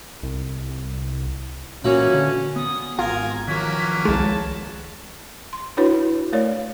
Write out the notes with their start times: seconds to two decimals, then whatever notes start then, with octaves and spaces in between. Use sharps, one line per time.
0.22 C2
1.84 A#2 E3 F#3 A#3 C#4
2.14 D3
2.56 B3 D#6
2.99 G#1 F4 A#4 G#5 A#5 G#6
3.48 D#3 F3 F#3 A#3 C#4 B6
4.05 C2 G#3 A5
5.53 C6
5.77 D4 E4 F#4 B4 C#5
6.33 A3 A#4 C#5 D5